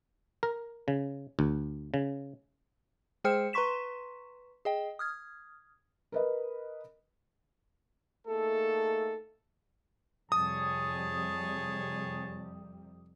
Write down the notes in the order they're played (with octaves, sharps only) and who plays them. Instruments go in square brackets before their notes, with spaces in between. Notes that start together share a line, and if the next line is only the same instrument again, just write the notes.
[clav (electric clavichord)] A#4
C#3
D2
C#3
[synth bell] G#3 G#4 C5 G5 F6 C#7
B4 A#5 C6 C#6 B6 E7
G#4 D#5 G5
D#6 F6 G#6
[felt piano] A#4 B4 D#5
[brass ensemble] A3 A#3 D#4 G#4 A4
[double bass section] F2 C3 G3 [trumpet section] G#4 C#5 A5 [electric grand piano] D#6